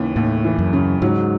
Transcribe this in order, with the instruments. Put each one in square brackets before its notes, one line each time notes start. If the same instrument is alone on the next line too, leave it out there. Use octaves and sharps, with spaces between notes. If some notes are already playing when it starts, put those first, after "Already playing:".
Already playing: [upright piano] D#2 C#3 E3
[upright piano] D#2 [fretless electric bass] A2
[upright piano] E3
[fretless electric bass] F#2
[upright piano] C#3
[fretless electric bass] G#2 [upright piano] F#3